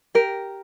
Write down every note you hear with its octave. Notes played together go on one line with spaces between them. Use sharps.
G4 A#4